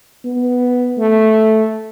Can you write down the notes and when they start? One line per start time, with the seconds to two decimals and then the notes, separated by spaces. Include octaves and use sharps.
0.25 B3
0.98 A3